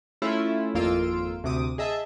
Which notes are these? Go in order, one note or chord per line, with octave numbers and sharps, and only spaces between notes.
A3 C#4 E4 F4
G#1 F2 A#3 F4 E6 D7
D2 C3 D6 D#6
G#4 D#5 E5 A5